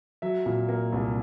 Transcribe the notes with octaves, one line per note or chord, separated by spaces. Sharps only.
F#3 E5
A#2
A#3
C2